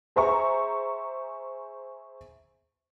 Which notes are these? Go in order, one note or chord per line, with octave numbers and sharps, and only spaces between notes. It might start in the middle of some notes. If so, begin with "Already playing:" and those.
G#4 C5 E5 A#5 C#6